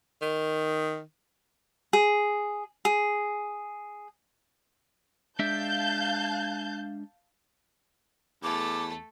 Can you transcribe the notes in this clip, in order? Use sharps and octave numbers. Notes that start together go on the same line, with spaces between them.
D#3
G#4
G#4
G#3 D4 E5 F5 A5 G6
E2 A3 A4 D6